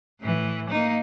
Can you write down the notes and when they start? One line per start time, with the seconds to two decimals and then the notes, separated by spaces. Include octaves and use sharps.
0.21 A2 E3
0.70 A#3 D#4